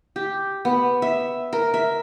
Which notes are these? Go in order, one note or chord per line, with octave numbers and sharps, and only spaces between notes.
G4
B3
E5
A#4
E5